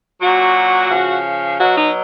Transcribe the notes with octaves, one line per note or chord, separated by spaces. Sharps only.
A#2 F#3 F#4
C#3 F3
B2 F#3 F#4
D#4